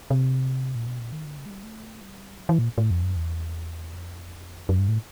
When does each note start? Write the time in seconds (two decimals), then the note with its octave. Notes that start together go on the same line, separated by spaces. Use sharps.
0.10 C3
0.75 A#2
0.87 B2
0.99 A#2
1.12 D#3
1.25 D3
1.38 C#3
1.46 G#3
1.51 G3
1.64 A3
2.01 G3
2.40 F#3
2.49 E3
2.59 A#2
2.78 A2
2.91 F2
3.03 F#2
3.16 E2
3.93 F2
4.69 F#2
4.79 G2
4.88 A2